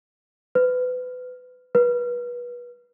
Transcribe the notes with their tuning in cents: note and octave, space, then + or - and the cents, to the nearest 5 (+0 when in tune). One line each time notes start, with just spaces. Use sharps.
B4 +25
B4 -30